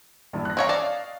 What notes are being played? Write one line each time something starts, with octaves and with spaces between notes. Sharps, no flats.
A#1 G2 E3
F#6 A#6
C4 C#5 D#5 F5 A#5
D5 A5